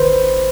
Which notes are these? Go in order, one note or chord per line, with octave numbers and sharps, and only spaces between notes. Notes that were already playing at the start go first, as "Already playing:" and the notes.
Already playing: G#1 D#3 B4 C5